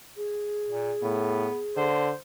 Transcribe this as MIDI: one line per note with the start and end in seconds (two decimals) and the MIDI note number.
0.16 1.86 68
0.68 0.92 46
1.02 1.48 45
1.02 1.60 59
1.77 2.11 50
1.77 2.17 72